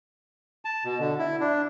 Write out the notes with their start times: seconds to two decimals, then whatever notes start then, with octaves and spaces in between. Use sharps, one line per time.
0.65 A5
0.84 B2
1.00 D3
1.19 E4
1.40 D4